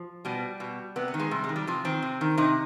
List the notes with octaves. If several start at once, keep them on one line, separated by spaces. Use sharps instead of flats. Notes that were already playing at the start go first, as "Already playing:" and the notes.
Already playing: F3
B2 G3
B2
C3 B3
B3
D#3
G#3
C3 G3
G#3
D#3
G3
C3 F3
D#3 C4
C3
D#3
C3 D#4